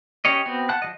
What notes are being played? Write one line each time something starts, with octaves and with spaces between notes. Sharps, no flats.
C#4 G4 C#5 D#5
B3 C4 F#4
F#5 A5 F#6
F3 G3 D#5